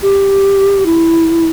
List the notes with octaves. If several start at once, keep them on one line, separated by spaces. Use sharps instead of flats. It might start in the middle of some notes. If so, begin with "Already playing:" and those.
G4
E4